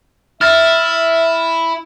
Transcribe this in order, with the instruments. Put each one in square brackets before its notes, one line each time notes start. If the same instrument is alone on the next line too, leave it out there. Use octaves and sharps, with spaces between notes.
[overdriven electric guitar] E4 [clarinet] E5 [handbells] F6 A6